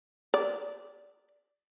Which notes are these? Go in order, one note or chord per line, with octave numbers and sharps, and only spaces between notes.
D5